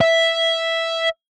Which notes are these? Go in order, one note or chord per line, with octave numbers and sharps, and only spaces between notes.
E5